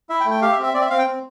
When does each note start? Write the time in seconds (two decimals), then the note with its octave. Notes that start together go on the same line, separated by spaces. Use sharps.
0.10 E4 E5
0.20 G5
0.25 A3
0.31 G5
0.42 G4 F5
0.52 E5
0.58 C4
0.63 E5
0.74 C4 D5
0.82 E5
0.90 C4 F5
0.98 G5
1.07 C4